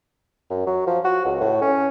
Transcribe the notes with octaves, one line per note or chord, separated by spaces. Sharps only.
F#2
F#3
F3
F#4
C#2
A2
C#4